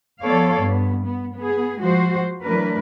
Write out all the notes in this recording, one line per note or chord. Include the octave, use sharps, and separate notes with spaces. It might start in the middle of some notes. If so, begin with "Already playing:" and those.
F3 B3 A4 C#5 D5 F5
G2 B3
B3
B3 G#4
F3 G#3 F#4 C5
E3 F#3 A3 D4 A#4 B4